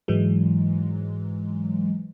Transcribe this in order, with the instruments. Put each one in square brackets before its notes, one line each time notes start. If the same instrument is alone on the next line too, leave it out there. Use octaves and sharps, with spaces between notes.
[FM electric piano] G#2 E3 F#3 G#3